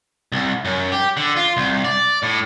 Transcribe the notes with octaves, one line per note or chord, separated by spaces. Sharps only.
C2
F#2
G4
D3
F4
C2
D5
A2